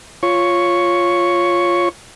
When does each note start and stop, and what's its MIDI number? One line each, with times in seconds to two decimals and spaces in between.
0.23 1.89 65
0.23 1.89 73
0.23 1.89 85